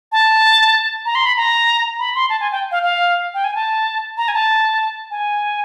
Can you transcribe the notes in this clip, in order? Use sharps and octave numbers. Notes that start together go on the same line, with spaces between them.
A5
A#5
C6
B5
A#5
B5
C6
A5
G#5
G5
F5
F5
G5
G#5
A5
A#5
G#5
A5
G#5